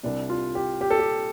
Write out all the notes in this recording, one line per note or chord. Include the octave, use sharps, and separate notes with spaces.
C2 C3 D4
F4
G4
G4
A4
G4